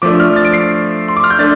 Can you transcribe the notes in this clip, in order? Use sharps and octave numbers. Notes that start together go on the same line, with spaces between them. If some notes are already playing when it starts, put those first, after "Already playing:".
F3 A3 D4 D6
F6
A6
D7
C7
C6
D6
F6
G6
A3 D4 A6